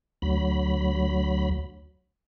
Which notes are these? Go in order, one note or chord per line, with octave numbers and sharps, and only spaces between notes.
D2 F#3 B5